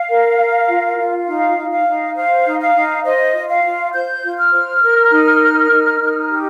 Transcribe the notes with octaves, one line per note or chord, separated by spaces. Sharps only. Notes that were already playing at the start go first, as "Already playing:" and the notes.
Already playing: F5
A#4
A#4
F4
F4
D#4 F5
D#4
F5
D#4
C5 F5
D#4
F5
D#4
C5 D#5
F4
F5
F4
C5 G6
F4
F6
C5
A#4
D#4
A#4
D#4
D#4
G4